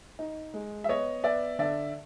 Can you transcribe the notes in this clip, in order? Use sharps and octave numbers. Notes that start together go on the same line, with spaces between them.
D#4
G#3
E5
B3 C#5 D#5
B3 D5 E5
D3 D5 E5